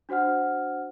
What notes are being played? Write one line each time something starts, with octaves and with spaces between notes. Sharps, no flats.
D4 F#4 C5 F#5 F6